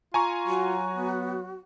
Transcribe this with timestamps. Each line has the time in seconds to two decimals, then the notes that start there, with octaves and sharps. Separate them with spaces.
0.14 F4 G#5 A#5 C#6
0.47 F#3 F#4
0.97 B3